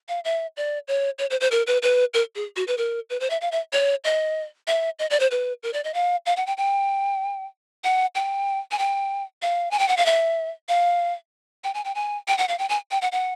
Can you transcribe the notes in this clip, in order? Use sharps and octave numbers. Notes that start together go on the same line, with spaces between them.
F5
E5
D5
C#5
C#5
C5
C5
A#4
B4
B4
A#4
G#4
F#4
B4
A#4
B4
C5
E5
F5
E5
C#5
D#5
E5
D#5
D5
C5
B4
A#4
D5
D#5
F5
F5
F#5
G5
G5
F#5
G5
G#5
G5
F5
G#5
G5
F#5
F5
E5
F5
G5
G#5
G5
G#5
G5
F#5
F5
G5
G#5
G5
F#5
F#5